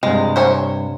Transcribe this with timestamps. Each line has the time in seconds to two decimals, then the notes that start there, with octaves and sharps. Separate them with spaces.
0.03 G2 C3 G#3
0.36 C5 C#5 G#5